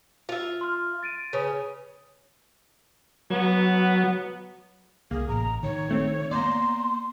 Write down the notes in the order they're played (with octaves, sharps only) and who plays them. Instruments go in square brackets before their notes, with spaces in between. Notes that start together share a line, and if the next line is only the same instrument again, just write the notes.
[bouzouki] F4 E5
[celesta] C6 F6
A6 D7 D#7
[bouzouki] C#3 C#4 [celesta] B4 D#6
[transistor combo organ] F#3 [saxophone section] B3
[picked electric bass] C2 [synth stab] A#3 [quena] G#4
[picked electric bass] A1 [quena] A#5
[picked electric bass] D#3 [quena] C#5
[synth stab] A#1 A3 C4
[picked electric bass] A#3 B3 [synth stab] D5 A#5 [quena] C6